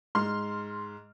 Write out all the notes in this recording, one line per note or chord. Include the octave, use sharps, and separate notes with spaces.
G#2 C6 F6